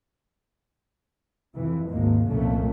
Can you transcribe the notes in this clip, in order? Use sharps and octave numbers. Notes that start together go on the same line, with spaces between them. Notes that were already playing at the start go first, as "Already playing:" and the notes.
F2 C3 E3
G#1 D#2 G#3 A#3
C2 F2 A#2 A3 A#3 C#4